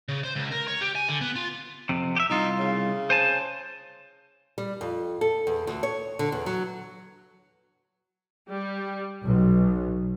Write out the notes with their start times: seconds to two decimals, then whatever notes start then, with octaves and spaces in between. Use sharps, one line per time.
0.09 C#3
0.23 C5
0.35 C#2
0.51 A#4
0.68 C#5
0.81 G4
0.95 G#5
1.09 D3
1.21 B3
1.36 F4
1.89 F2 C3
2.16 G4 E5
2.30 C2 D#4 F4
2.59 C#3
3.10 C5 G#5 A5
4.58 G3
4.81 F2
5.21 A4
5.47 E2
5.67 D2
5.83 C#5
6.19 D3
6.32 E2
6.46 F#3
8.49 G3
9.23 B1